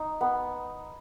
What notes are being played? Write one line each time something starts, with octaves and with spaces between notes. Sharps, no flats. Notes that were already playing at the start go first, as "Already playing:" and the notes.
Already playing: D#4
B3